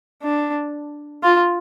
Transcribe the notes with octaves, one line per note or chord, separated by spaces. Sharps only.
D4
F4